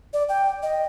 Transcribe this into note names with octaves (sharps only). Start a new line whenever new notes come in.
D5
G5
D#5